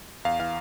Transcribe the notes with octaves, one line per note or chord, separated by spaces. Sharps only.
E2 F5
E3 F5